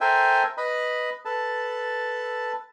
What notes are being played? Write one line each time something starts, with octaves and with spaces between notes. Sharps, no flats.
A4 A#4 C5 E5 G5 G#5
B4 D#5 B5
A4 B4 A5